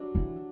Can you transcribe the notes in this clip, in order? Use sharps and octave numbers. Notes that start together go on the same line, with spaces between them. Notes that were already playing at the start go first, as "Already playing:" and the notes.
Already playing: G2 F#3 A3 D4 F#4
E3